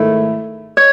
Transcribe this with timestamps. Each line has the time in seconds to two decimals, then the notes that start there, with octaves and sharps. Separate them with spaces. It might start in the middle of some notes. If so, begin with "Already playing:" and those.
Already playing: G#2 D#3 A3 E4
0.77 C#5